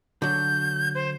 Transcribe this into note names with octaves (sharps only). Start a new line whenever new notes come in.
D3 F#3 G6
C5